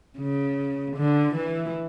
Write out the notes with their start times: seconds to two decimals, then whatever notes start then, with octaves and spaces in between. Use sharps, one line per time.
0.18 C#3
0.97 D3
1.35 E3